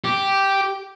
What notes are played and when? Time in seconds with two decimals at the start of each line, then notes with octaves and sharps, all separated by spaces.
0.04 G4